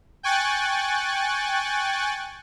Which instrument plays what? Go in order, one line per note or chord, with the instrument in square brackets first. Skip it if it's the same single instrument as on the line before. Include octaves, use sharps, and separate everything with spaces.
[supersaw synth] G5 G#5 C#6 F#6 A6